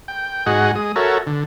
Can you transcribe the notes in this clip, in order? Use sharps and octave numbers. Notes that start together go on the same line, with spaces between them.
G5
G#2 F#4 G#4 D#5 F#5
G#3 D#6
F#4 A4 A#4 C#5 E5
D3